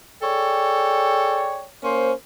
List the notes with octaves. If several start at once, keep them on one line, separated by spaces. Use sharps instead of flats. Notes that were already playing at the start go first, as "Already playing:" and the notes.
G#4 A4 C#5 D5 G5
A#3 C#4 C5